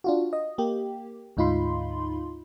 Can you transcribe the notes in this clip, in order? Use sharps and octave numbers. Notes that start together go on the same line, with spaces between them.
D4 F4 F#4
D#5
A#3 G4
D2 G#2 D#4 F4 B5 C6